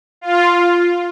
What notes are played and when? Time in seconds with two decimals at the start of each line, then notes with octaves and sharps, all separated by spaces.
0.21 F4